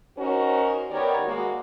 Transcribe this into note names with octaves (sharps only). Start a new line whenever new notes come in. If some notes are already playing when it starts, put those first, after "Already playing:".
C#4 D#4 F#4 A#4 C5
D#3 B3 G4 A#4 C#5 D5
G#3 A#3 F#4